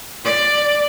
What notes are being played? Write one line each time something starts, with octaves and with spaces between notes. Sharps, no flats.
D5